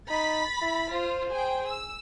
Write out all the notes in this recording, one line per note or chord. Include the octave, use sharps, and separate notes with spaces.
D#4 B5 A6 B6
E4
F4 C5
G#4 G5
E6